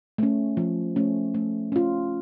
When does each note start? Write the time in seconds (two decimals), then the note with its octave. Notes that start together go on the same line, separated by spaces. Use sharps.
0.18 A3 C#4
0.57 F3
0.96 A3 C#4
1.34 A3
1.72 C#4 F4